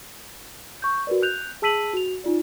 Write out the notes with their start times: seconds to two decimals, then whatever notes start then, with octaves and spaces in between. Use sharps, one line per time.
0.82 C#6 G6
1.07 F#4 A#4 B4 D5
1.23 F#6 G6 F7
1.62 G#4 A5 E6 B6 D#7 F#7
1.93 F#4 F7
2.24 D#4 F4 D5